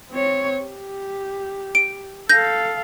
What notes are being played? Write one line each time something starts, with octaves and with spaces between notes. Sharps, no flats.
C4 C#5
G4
D7
A4 F5 G6 A#6